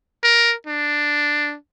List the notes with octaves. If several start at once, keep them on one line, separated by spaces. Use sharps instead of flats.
A#4
D4